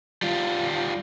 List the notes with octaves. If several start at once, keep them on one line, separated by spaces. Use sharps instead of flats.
G3 F4